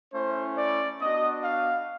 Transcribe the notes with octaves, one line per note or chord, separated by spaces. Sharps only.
A3 C#4 E4 C5
D5
B3 D4 F#4 D#5
F5